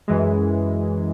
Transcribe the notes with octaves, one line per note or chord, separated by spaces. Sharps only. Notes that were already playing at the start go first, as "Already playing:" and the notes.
F#2 E3 G#3